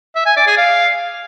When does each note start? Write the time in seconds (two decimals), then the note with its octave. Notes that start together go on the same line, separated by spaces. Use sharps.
0.15 E5
0.26 G#5
0.36 D5
0.47 G#4
0.57 F5